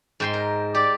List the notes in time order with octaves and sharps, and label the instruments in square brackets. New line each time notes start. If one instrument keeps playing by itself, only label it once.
[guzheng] G#2 G5 C6
A#4
[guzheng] G4 [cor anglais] D5